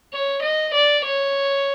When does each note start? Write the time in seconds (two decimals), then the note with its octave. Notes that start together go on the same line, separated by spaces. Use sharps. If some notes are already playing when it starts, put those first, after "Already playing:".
0.13 C#5
0.43 D#5
0.75 D5
1.05 C#5